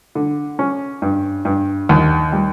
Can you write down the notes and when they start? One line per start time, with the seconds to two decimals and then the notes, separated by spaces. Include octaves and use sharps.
0.15 D3
0.59 C#4
1.02 G2
1.45 G2
1.89 D#2
2.32 G3